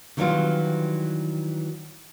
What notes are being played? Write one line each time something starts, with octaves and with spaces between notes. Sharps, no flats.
D#3 E3 F#3 G3 C4 F4